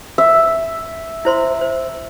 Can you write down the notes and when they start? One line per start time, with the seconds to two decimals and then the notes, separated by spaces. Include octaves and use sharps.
0.18 E5
1.25 E4 C5 C6
1.61 C5